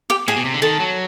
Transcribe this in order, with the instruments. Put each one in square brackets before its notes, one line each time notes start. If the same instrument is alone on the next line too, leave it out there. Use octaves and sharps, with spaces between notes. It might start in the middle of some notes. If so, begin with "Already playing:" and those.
[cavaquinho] G4 G5
[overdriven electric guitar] A2 [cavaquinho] G#4 G#5
[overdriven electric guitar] B2
C3
D3
[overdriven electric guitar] D#3 [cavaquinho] A4 A5
[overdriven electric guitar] F#3